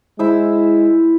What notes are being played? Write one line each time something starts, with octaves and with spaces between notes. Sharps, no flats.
G#3 E4 C5 E6